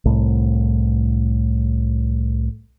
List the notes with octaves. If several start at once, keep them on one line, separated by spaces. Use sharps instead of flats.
C2 A2